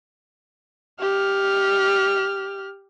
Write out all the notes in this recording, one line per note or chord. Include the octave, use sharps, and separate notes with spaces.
G4 F6